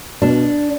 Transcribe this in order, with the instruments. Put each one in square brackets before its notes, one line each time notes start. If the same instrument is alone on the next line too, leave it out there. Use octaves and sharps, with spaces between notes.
[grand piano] B2 [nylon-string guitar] D4